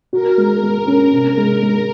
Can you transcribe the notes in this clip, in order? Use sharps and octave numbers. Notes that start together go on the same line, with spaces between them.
F#4 A#4
G#3
G#3 A#4
C#4
C3
G#3
G#3